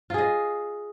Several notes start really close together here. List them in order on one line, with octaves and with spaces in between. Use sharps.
F4 G#4 D#5